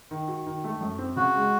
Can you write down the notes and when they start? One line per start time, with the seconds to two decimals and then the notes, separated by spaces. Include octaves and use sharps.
0.11 D#3
0.28 F#4
0.46 D#3
0.64 A3
0.81 F#2
0.98 C4
1.17 C#3 F#4
1.35 G#3